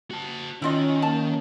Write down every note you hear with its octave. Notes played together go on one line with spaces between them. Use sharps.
F#4 A5
D#3 C#4 E4 F4 D#5
A#3 C#4 A5